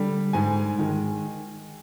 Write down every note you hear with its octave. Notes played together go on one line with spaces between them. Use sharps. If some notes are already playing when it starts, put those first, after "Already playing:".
Already playing: D3 G3
G#2 G#5
D#3 G#3